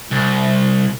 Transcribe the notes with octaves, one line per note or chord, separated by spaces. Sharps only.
C2